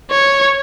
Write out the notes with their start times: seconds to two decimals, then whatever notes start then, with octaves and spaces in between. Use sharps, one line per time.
0.11 C#5